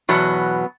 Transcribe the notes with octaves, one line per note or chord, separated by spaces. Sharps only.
E2 B2 F#3 B3